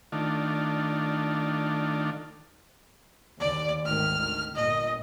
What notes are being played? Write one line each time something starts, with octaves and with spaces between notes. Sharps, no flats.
D#3 A3 D4 F4
D#2 D5
G#1 D2 D#3 F6
D#3
G1 A#2 D#5